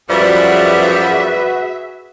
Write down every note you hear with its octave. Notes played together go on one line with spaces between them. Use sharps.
F#2 F3 G3 F#4 G#4 B4 E5